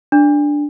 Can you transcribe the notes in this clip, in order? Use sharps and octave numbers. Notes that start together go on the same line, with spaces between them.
D4